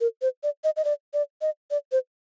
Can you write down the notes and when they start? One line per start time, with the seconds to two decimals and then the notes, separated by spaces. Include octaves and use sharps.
0.01 A#4
0.22 C5
0.43 D5
0.64 D#5
0.76 D#5
0.85 D5
1.14 D5
1.42 D#5
1.71 D5
1.92 C5